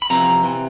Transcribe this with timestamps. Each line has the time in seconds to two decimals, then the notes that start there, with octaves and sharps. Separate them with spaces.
0.02 B5
0.10 F2 C3 E3 A#5
0.43 C3 E3